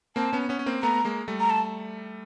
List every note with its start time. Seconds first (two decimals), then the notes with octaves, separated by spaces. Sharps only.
0.16 A#3 C4 A5
0.33 B3 C#4
0.49 B3 C#4
0.59 C#4
0.66 A#3 C4
0.82 A3 B3 A#5
1.05 G#3 A#3
1.28 G3 A3
1.40 A#5
1.50 A5